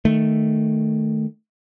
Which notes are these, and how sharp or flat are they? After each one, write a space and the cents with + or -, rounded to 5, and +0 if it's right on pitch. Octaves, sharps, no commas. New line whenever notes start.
D#3 +0 A3 +0